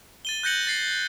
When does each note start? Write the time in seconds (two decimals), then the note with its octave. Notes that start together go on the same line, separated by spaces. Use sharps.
0.25 A6 D#7 G7
0.43 F#6 G6 A#6 C#7 F#7
0.67 A6 C7